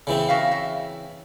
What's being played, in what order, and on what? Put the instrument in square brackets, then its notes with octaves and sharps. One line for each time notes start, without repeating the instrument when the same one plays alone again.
[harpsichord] C#3 E3 C4
[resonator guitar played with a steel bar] F#4 E5 F5
E5